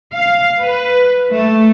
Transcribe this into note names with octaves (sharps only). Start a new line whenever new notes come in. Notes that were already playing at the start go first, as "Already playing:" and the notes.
F5
B4
A3